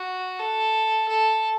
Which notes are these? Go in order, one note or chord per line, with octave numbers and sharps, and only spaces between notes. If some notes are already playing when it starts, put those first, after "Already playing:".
Already playing: F#4
A4
A4